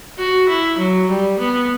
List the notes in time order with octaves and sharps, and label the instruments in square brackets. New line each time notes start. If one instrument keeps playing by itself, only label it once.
[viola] F#4
E4
F#3
G3
B3